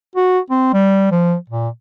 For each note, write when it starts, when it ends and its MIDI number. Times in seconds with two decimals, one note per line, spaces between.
0.16 0.39 66
0.50 0.73 60
0.73 1.10 55
1.11 1.35 53
1.50 1.69 46